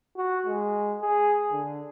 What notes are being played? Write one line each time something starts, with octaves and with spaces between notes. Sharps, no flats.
F#4
G#3
G#4
D3